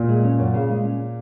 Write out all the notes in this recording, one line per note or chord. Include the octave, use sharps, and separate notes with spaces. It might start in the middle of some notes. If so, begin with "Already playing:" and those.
Already playing: A#2
G#3
C#4
F#2
C#3
G#3
C#4